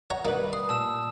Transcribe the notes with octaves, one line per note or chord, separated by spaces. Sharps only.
C#5 F#5 A#5
G3 A#3 D#4 B4
C6 D#6
A#2 A5 E6 E7